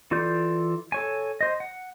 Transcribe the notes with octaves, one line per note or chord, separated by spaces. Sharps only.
E3 F4 A4 D5 G6
A4 C#5 G#5
C5 D#5
F#5